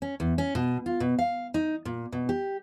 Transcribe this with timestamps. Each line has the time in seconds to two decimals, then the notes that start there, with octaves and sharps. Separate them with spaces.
0.02 C#4
0.20 E2
0.38 C#4
0.55 B2
0.86 F4
1.00 B2
1.19 F5
1.54 D#4
1.85 A#2
2.12 B2
2.29 G4